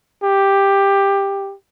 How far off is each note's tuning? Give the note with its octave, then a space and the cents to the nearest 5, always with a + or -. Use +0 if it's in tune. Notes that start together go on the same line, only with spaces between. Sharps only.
G4 +10